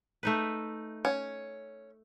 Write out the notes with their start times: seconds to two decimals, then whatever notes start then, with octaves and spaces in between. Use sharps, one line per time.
0.23 A3 D#4 B4
1.05 C#4